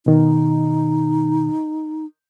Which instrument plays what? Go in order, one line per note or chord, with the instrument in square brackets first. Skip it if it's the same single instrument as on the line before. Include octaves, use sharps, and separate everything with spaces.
[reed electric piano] B2 D#3 [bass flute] D#4